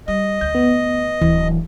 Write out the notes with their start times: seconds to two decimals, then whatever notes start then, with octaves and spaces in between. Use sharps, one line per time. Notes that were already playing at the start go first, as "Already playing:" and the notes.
0.08 G3 D#5
0.41 D2 G6
0.55 B3
1.21 D1 E3